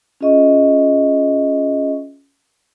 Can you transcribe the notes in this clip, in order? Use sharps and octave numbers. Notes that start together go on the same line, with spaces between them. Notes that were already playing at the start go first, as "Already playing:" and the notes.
C#4 F4 G#4 D#5 E5 C#6